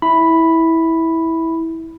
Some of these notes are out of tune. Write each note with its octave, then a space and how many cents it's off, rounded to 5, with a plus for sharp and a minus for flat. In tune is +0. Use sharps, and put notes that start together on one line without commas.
E4 -15 B5 +0